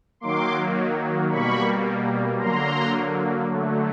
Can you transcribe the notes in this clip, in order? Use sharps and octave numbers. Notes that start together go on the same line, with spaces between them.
D#3 F#3 A#3 C6 D6
B2 G3 A#3 B5 C#6
D3 F#3 A#3 A#5 C6
D3 F#3 A3